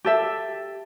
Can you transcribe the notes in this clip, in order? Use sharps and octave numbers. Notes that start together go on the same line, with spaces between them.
G4 A4 E5